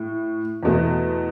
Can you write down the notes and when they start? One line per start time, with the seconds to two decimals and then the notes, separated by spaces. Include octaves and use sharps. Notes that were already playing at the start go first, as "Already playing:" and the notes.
Already playing: A2
0.63 E2 B2 A3